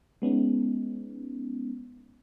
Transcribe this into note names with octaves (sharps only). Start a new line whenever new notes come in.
G#3 B3 C#4 D#4